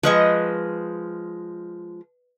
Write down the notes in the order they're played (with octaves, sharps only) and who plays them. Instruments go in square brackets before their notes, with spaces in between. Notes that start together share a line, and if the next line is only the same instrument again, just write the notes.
[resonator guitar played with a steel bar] F3 G#3 [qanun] B4 D#5 C#6